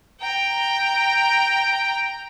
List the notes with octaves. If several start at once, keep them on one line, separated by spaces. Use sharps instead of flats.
G5 A#5